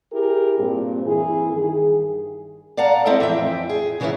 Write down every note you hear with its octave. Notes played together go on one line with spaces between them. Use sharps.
E4 G4 G#4 A#4
G2 A#2 C4
E3 E4 G#4
G2 D#3 G#4
D5 F5 F#5 A5 A#5
C4 E4 A4 D#5 G5
F2 E3 E5 G5
G#4
C#3 E3 F#3 B3 C#4 E4